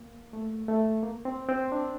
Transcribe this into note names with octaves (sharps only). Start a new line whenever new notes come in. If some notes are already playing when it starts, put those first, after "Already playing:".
Already playing: A#3
A3
A3
A#3
C4
C4
D4